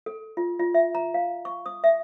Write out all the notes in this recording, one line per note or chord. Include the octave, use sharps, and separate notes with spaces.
A4
F4
F4
E5
A#5
F5
C#6
D#6
E5